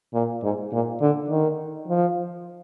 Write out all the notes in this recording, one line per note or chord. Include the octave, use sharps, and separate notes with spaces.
A#2
G#2
A#2
D3
D#3
F3